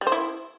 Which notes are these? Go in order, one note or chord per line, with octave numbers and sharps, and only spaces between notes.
G3
C5
E4